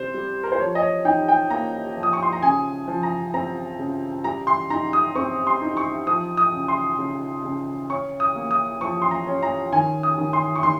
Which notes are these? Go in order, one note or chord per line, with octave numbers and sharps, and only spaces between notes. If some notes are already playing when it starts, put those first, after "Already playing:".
Already playing: C3 G3 C5
G3
A#4
C5
F3 C#5
D#5
C#5
D#4 G5
G5
A#3 A#5
F3
D#6
C#6
C6
A#5
C#3 G#5
F3
A#5
C4 A#5
C#3
G3 A#5
C6
D#4 A#5
D#6
C4 C#6
C6
D#4
C#6
F3 D#6
D#6
C#3
C6
C#3
C#3
C#4 C#6
D#6
A#3
D#6
F3 C#6
C6
A#5
C#4
A#5
D#3 G#5
D#6
D#3
C6
C#6
D#3 C6